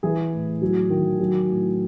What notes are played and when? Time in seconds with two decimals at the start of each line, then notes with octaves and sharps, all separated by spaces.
0.03 E3 G#4
0.33 A2
0.62 F#3
0.90 D#3
1.20 F#3
1.49 A2